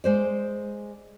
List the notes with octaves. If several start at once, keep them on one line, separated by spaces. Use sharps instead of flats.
G#3 C5 D5